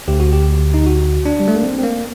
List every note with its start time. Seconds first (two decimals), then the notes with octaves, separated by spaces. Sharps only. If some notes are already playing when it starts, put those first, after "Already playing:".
0.08 D2 D3 G4
0.20 F#4
0.33 G4
0.74 D#4
0.86 F#4
1.26 D4
1.40 G3
1.48 A3
1.56 A#3
1.63 C4
1.78 C4
1.83 A#3